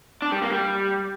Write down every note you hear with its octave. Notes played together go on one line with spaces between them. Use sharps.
D4
G3
A#3
G3